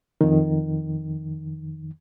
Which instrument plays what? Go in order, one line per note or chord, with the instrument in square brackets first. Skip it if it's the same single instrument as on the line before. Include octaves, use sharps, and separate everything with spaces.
[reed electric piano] F2 D#3